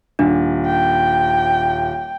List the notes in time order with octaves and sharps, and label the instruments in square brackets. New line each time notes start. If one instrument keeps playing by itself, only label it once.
[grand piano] D#1 [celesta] D4
[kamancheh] G5